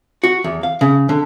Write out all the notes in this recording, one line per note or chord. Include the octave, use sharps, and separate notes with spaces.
F#4
E2
F5
C#3
D3